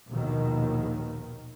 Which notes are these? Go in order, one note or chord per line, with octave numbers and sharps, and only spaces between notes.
A#1 D#2 B2 D#3